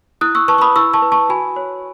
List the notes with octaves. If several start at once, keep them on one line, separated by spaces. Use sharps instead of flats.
E4 D#6 F#6
C#6 E6
B4 A5 C#6
C#6
B5 D#6
E4 C#6 E6
A5 C#6
B4
A5 C#6
F#4 G#5 B5
C#5